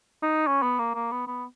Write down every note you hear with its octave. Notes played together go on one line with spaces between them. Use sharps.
D#4
C#4
B3
A#3
A#3
B3
B3